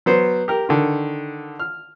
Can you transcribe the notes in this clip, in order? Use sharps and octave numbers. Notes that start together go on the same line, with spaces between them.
F#3 B3 C5
G4 A#4
D3 D#3
F6